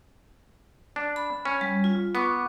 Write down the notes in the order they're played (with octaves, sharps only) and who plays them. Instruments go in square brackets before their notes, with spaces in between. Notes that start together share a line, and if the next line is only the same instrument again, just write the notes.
[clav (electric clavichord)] D4
[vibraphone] B5
[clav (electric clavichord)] C#4
[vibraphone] G3
F4
[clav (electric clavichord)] B3 [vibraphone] C#6 D6